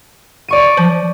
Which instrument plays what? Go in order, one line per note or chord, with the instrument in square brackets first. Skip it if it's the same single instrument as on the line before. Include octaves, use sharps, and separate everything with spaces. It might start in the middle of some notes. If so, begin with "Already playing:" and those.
[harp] D5 C#6 D#7
[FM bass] F3